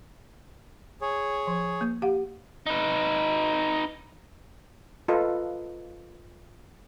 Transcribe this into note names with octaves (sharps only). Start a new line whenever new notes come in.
G#4 C#5
F3
A#3
G4 F5 F#5
D#4 B4
F4 A4 B4 D#5